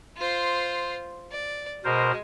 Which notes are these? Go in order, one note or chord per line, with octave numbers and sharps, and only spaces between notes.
F4 C5
D5
B2 G#3 A#4 C5